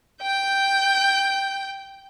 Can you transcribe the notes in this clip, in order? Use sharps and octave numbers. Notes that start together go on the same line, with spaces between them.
G5 G6